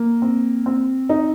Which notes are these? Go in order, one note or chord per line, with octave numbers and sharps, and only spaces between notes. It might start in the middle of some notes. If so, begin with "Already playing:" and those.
Already playing: A#3
C4
C4
D#4